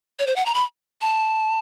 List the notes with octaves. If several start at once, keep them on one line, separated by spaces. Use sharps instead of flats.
C#5
C5
F#5
A#5
B5
A5